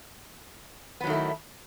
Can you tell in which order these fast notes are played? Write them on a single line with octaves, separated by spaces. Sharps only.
B3 F#3 D#3 A3 E4